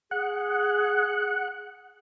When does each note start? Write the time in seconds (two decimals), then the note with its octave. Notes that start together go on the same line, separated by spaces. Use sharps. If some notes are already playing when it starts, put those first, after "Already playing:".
0.11 G#4 F#5